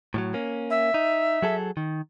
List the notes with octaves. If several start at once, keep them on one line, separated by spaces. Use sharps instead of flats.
A2 F3 F#3
A#3 C#4
E5
D#4
F#3 G#4 A4
D#3